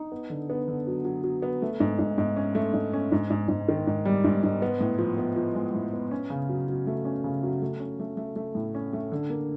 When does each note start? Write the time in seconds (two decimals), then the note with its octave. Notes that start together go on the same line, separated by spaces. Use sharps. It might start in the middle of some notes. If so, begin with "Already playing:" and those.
Already playing: D#4
0.12 B3
0.30 D3
0.50 B3
0.68 D3
0.87 F#3
1.05 F#3
1.24 F#3
1.42 B3
1.62 A3
1.80 G#2
1.99 G#2
2.18 G#2
2.36 C#4
2.55 A3
2.73 G#2
2.93 C#4
3.12 G#2
3.30 G#2
3.48 G#2
3.68 D#3
3.87 G#2
4.05 G3
4.24 G#2
4.43 G#2
4.62 B3
4.80 A2
4.98 F3
5.18 B3
5.36 F3
5.55 G#3
5.75 A2
5.93 B3
6.11 C#4
6.30 C#3
6.49 F#3
6.68 F#3
6.87 A3
7.05 C#4
7.24 C#3
7.43 F#3
7.62 A3
7.80 C#4
8.00 A3
8.17 A3
8.36 A3
8.55 A2
8.75 C#4
8.93 A3
9.12 D3
9.30 A#3